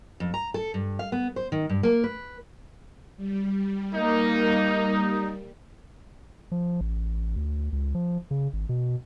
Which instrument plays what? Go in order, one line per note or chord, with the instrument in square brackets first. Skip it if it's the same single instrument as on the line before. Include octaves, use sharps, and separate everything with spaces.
[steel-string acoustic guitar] F2
A#5
A4
G2
F5
B3
C5
D#3
G2
A#3
B4
[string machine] G3
[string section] A#3 [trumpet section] D#4
[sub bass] F3
A1
D2
C#2
F3
C#3
G#1
B2